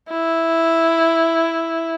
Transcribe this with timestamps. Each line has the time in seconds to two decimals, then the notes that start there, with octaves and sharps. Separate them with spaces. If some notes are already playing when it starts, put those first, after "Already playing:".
0.10 E4